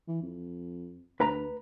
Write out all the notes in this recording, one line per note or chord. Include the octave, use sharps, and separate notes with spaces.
E3
F2
D2 B4 A#5 B5